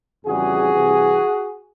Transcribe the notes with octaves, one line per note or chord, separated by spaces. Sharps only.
F2 C#3 E3 G3 F#4 G#4
C2 C3 E3